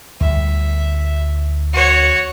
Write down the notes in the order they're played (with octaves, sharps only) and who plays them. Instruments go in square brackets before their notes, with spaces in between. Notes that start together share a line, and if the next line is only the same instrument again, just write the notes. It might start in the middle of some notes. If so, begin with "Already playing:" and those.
[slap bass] D2 G3 [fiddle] E5
[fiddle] F#4 C#5